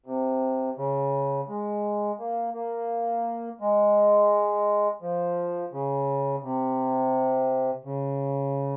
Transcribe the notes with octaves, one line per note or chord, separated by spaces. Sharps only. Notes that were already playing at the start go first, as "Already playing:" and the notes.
C3
C#3
G#3
A#3
A#3
G#3
F3
C#3
C3
C#3